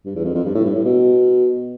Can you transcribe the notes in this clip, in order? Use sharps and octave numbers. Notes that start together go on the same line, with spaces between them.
G2
E2
F2
F2
G2
A2
G2
A2
B2